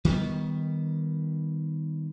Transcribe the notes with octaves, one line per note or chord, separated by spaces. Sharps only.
D#3 G3 G#3 B3